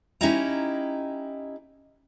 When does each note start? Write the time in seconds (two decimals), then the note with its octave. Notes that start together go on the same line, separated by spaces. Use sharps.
0.21 C#4 D#4 E4 G4 D#5 A#5